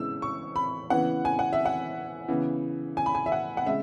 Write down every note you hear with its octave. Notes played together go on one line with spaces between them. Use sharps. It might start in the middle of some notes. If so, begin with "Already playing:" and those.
Already playing: C#3 E3 G#3 B3 E6
C#6
B5
C#3 E3 B3 F#5
G#5
F#5
E5
F#5
C#3 E3 B3
G#5
B5
G#5
E5
F#5
F#5
C#3 G#3 E5